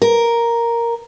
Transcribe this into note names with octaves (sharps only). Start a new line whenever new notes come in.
A#4